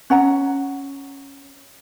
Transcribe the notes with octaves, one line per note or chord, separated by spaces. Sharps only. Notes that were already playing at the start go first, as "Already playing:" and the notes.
C#4 F#5 A#5